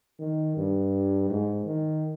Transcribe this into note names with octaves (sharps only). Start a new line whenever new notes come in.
D#3
G2
G#2
D#3